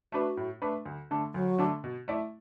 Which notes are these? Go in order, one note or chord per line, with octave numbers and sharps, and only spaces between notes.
A3 D4 F#4 B4
A2
A3 D4 B4
D2
D3 A3 D4 A4
D2 F#3
D3 A3 D4 A4
B2
A3 E4 D5